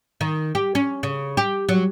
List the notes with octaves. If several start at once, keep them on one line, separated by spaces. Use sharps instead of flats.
D#3
G4
C#4
C#3
G4
F#3